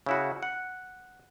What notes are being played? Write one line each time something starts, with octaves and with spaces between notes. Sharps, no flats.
C#3 E4 F#4
F#5